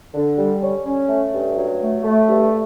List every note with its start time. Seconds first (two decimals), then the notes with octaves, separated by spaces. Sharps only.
0.15 D3
0.38 G3
0.61 C#4
0.85 C#4
1.09 A3
1.33 G2
1.57 F#3
1.80 A3
2.04 A3
2.27 G2